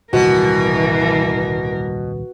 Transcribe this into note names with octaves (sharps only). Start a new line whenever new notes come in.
D#1 C2 G#2 B2 E3 F#4 A#4